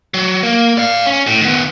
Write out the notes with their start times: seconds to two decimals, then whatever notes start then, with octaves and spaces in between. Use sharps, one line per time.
0.14 F#3
0.43 A#3
0.78 D5 F5
1.06 C#4
1.27 A2
1.41 D#3 B3